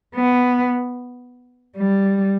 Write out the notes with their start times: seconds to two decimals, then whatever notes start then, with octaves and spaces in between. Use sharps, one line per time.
0.15 B3
1.76 G3